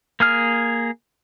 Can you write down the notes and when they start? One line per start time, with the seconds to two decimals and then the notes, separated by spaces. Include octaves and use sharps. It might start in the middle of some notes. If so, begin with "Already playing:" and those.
0.20 A#3 G#4 F6